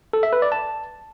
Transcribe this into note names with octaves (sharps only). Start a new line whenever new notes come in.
A4
E5
B4
D5
A5